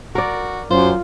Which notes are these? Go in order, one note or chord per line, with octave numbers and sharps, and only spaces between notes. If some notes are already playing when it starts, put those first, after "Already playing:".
F#4 A#4 D5
F#2 F4 C5